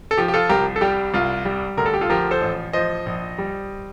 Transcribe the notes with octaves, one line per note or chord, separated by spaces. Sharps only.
A4
F3 G4
G4
F4 A4
C2 G4 A#4
A4
G3 G4
C2 F4
G3
D2 A#4
A4
G4
F4 A4
F3 G4 A#4
A4 C5
A1
F3 C5 D#5
A#1
G3